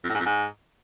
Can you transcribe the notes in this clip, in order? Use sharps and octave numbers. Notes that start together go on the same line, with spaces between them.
F2
A2
G#2
F2
G#2